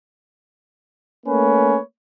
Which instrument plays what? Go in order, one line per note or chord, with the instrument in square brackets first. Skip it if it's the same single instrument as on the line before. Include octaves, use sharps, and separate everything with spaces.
[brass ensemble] A3 A#3 C#4 B4 C#5